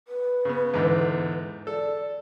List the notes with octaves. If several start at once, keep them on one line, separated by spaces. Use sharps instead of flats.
B4
C#3 B3
E2 G#2 D3
A4 D5